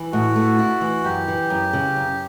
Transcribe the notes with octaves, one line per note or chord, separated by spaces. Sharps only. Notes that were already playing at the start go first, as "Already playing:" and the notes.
Already playing: E3
A2 F#4
A3
E4
E3
F#2 G4
E3
F#2
C#3
F#2